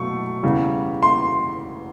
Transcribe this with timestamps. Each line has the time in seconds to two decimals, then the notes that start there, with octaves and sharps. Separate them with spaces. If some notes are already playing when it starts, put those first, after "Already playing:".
Already playing: B2 F#3 A3 C#6
0.43 E2 C#3 E3 G3
1.03 C6